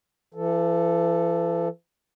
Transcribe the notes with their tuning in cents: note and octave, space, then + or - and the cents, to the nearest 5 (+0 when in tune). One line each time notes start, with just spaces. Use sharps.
E3 +45 A4 +0